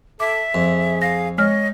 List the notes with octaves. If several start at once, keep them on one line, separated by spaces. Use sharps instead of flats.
A4 E5 D6
F2 G#4
F5 A#6
G#3 C#5 D#5 F6